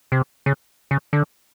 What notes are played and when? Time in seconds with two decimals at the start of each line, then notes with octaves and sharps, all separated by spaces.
0.12 C3
0.46 C#3
0.91 C#3
1.13 D3